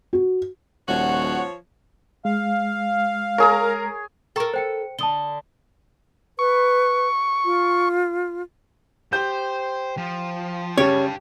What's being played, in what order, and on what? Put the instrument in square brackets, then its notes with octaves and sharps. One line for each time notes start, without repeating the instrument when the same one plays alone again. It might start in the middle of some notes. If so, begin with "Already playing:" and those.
[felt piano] F#4
[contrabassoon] D#1 [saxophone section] F3 C#5 [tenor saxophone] F#4 [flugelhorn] F#5
[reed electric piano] G#3 [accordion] F5
[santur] G#4 C#5 [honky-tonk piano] A#4 A#5
[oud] A4 A#4 [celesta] G5 A#5 C#6
[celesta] C5 G5 C#7
[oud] D3 [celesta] A5 D#6 G7
[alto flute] B4 [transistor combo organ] C#6
[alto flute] F4
[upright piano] G4 G6 [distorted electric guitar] C5
[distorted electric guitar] F3
[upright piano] C#3 G3 [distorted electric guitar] G4 A5 [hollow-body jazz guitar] C#5